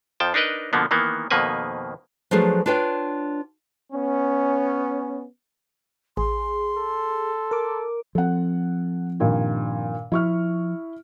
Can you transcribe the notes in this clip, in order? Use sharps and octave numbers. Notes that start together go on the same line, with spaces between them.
F2 F3 G5 A5
D4 D#4 A#4 B4 D#5
B2 D3 F3 A#3 B3
D#3 E3 A#3 B3
F2 B2 D#3 A#3 B4 G#5
F3 F#3 A3 D4 G#4 B4
D4 F4 B4 C#5 G5
B3 C#4
A1 G#4 C6
A4
A#4 D6
F3 C4 A4 F#5
G2 A#2 D#3
F3 E4 C#6 F6